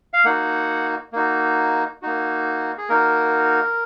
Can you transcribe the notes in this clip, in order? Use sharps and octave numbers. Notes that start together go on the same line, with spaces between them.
F5
A#3 D#4 F#4 F#5
A#3 D#4 F#4
A#3 D#4 F#4
G#4
A#3 D#4 F#4 A#4